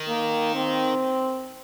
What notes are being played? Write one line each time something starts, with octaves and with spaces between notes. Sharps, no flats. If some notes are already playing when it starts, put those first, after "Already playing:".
Already playing: D#3
A#3
C4